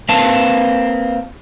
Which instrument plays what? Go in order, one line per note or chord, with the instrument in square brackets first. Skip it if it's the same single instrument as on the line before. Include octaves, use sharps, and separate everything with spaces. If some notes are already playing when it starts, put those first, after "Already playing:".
[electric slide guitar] A#3 C4 B4 F5 A5